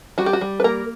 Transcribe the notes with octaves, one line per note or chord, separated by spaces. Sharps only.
G3 F#4
G4
F#4
G3
B4
A#3 A#4